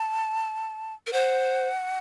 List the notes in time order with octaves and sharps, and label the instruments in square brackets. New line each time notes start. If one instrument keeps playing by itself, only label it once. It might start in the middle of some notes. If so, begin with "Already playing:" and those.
Already playing: [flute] A5
[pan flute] A#4
[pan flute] C5 [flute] F#5